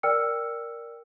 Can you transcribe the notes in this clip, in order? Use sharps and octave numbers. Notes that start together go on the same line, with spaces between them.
A#4 D5 G5 E6 F6 C#7